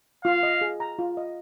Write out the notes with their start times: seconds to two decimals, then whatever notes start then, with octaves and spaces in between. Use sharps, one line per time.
0.25 F4 F5
0.43 D#5
0.61 G#4
0.80 A#5
0.99 F4
1.17 D#5